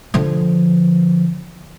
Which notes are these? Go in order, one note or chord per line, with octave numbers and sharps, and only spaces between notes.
D3 F3